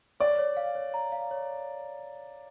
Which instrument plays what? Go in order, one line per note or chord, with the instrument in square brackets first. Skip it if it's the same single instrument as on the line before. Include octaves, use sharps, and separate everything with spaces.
[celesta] C#5 [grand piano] D5
[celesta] C#5
F5
C#5
A#5
F5
C#5